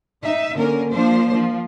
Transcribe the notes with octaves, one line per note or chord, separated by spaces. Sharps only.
D#4 E5
D3 A#3 C#4 A#4
F3 A#3 D4 C5
F3